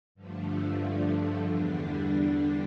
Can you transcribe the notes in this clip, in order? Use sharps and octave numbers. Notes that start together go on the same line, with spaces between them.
G2 D3 F3 A3
E2 D3 G3 D4